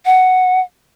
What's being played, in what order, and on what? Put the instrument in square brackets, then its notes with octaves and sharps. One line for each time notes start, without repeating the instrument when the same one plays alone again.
[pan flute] F#5